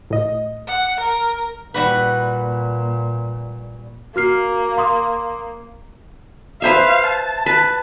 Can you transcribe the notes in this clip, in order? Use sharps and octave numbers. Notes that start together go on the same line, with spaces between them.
A2 D#5
F#5
A#4
A#2 G3 F#4 B4
A#3 F#4 F6 C7
F5 C6 D#6
B4 C5 E5 F5
A5
B4